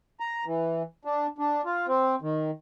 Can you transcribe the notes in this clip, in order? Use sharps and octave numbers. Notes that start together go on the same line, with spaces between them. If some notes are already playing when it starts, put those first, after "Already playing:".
A#5
E3
D4
D4
F4
C4
D#3